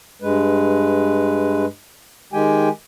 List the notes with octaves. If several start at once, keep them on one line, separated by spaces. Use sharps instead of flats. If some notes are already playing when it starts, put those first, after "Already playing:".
G2 G#3 B4
D#3 G#3 G4 G5 G#5